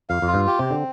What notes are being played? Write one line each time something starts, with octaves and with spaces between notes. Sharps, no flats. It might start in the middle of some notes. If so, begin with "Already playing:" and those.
F2 F5
F2
F4
G2
G4
C3
C4
D3